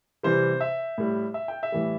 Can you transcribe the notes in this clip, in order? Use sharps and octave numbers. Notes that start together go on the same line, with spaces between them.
C3 E3 G3 C5
E5
A2 G3
E5
G5
E5
A2 E3 G3